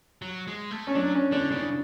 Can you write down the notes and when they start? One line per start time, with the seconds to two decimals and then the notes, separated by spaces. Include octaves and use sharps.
0.22 F#3
0.47 G#3
0.71 A3
0.87 C#4
0.95 F#3 D4
1.14 C#4
1.32 D3 D4
1.51 C#3 D4